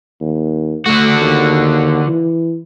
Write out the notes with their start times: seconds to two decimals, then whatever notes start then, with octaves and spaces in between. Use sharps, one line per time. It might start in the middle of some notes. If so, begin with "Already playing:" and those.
0.21 D#2
0.86 D3 A3 F#4
1.21 D#2
2.07 E3